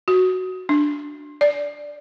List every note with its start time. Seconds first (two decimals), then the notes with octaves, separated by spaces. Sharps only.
0.08 F#4
0.69 D4
1.41 D5